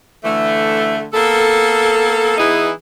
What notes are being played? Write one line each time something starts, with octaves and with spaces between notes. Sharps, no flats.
D3 E3 A3
A#3 B3 A4
E3 B3 D#4 E4 G#4